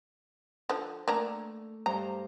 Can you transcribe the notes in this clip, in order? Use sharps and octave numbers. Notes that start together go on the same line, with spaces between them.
D3 F3
A3 A#3 D4 A#5 E6
G2 G3 C5 A#5